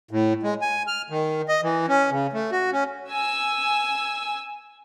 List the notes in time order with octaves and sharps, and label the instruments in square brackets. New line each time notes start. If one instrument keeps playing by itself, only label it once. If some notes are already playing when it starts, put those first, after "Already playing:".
[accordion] A2
G#3
G#5
F6
D#3
D#5
E3
C#4
C#3
A3
F#4
C#4
[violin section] G#5 E6